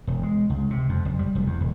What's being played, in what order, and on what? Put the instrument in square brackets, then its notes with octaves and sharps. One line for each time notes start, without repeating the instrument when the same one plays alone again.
[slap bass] E1
G#3
C#2
C3
F2
F#1
G3
F1
E2
D#1